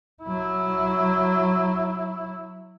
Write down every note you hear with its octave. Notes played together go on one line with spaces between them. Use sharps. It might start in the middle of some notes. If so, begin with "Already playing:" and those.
F#3 E4